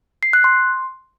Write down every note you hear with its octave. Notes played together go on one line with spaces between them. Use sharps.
C7
F#6
C6